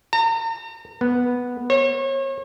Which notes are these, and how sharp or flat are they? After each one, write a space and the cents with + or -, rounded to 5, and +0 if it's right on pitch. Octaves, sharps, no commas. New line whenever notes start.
A#5 -40
B3 -5
C#5 -35